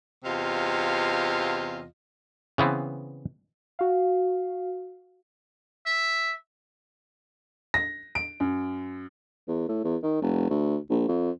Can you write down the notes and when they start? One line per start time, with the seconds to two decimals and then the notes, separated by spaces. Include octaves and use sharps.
0.25 E2 C3 F4 D#5 F5
2.58 C#3 E3 B3 C4
3.79 F#4 F5
5.86 E5
7.74 A#6
8.15 D7
8.40 F#2
9.48 E2
9.69 A2
9.84 E2
10.03 D#3
10.22 F1
10.50 D2
10.90 A#1
11.09 F2